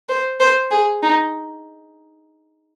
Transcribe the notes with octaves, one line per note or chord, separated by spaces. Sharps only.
C5
C5
G#4
D#4